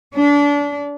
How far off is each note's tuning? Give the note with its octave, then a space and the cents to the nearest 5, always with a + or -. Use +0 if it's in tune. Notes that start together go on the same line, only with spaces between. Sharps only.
D4 -30